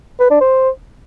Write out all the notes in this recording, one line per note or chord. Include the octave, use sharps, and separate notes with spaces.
B4
D4
C5